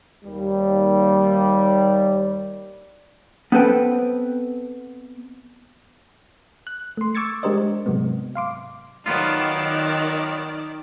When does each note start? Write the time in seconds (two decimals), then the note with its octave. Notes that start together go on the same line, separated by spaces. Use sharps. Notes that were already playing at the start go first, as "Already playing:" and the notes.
0.24 D#2 G3
3.52 B3 C4 A4 B4 G5
6.67 F#6
6.97 A3 C6
7.15 C#6 D6 E6 G#6 A6 C#7
7.43 G#3 D4 G4 A#4 C5 D#5
7.86 G#2 C3 F#3 G#3 B3
8.35 F5 C6 D6
9.06 D#3 F#3 B3 F4 D5